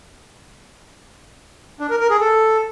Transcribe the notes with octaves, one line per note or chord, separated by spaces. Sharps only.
D4
A#4
A#4
G#4
A4